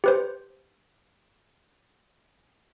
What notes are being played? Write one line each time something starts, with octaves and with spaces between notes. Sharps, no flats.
G4 B4 C5